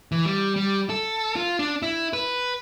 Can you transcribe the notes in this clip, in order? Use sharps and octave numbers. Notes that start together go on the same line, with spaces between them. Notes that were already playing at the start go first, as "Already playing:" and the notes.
E3
G3
G3
A4
F4
D4
E4
B4